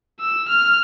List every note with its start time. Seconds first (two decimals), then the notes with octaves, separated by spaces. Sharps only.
0.20 E6
0.49 F6